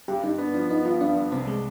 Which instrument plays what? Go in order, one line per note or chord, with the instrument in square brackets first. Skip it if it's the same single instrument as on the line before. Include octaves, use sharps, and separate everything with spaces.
[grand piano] G2 [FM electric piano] G4
[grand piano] G2 [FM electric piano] D#4
[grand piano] B3 [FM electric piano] D4
[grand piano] F3 [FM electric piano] D4
[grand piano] B3 [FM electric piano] D#4
[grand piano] G2 [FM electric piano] F4
[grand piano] G2 [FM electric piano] D4
[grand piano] G2
[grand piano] C2 [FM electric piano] C4
[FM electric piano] G#3